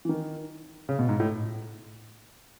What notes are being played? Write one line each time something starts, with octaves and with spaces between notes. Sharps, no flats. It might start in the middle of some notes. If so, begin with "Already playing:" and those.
E3
D#3
C#3
B2
G#2
A2